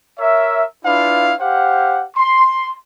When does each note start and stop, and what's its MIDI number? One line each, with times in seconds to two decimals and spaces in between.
0.19 0.64 70
0.19 0.64 73
0.19 0.64 76
0.85 1.34 62
0.85 1.34 64
0.85 1.34 65
0.85 1.34 71
0.85 1.34 77
1.40 2.04 67
1.40 2.04 72
1.40 2.04 77
1.40 2.04 78
2.17 2.73 84